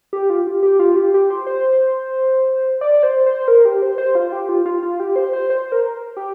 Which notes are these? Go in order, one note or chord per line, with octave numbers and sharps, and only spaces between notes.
G4
F4
G4
G4
F4
G4
G4
C5
C5
D5
C5
C5
A#4
G4
C5
C5
F4
G4
F4
F4
F4
G4
C5
C5
C5
A#4
G4